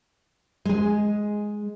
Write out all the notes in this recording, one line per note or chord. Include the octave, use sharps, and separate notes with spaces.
G#3 G#4